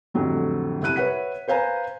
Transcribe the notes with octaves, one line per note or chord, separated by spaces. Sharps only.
F2 A2 D3 F#3 G3
C2 E4 F#6 D#7
B4 C#5 E5 F#5 F#6 B6
B4 C5 F5 G#5 A#5